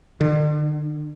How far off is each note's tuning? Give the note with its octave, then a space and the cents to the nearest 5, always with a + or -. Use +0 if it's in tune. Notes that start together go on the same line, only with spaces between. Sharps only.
D3 +40